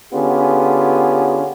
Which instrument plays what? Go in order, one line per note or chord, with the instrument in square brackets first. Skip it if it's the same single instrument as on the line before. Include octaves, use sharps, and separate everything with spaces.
[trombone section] D3 B3 C#4 F4 G4 G#4